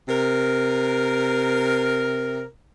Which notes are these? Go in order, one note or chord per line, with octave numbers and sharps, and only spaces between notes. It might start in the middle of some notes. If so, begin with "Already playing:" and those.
C3 A#4